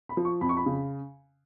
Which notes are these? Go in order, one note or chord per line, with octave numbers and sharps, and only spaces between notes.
B5
F3
C#6
F2 B5
C#6
B5
C#3